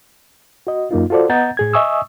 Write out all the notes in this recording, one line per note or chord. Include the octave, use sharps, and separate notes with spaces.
F#4 D#5
F#2 A#3 D#4 F4
F4 F#4 A4 C5 D5
B3 D#5 F#5 A#5 G6 A6
A2 G#4 G#6
D#5 E5 G#5 C#6 D#6 E6